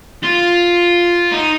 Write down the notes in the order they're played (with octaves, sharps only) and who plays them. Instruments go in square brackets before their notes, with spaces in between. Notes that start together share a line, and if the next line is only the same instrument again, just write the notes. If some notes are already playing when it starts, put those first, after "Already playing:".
[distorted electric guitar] F4
D#4